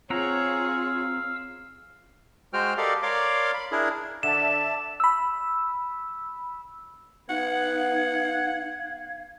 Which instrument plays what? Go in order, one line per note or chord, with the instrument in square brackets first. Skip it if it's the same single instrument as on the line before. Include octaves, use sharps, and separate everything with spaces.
[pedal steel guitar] C4 F#5 A#5 [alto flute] F4 [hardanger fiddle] G#4 C#5 [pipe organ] F5 E6
[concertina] G#3 F#4 C5 G5 F6
G4 A4 A#4 D5 D#5 F5
A#4 C#5 D5 F5 C6 D6
B5
D4 E4 G#4 A#4
[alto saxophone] D3 [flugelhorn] D5 [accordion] E5 A5 [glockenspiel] E7
[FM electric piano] B5 E6
[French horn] B3 [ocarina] D#4 [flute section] F5 G#6 [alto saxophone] F#5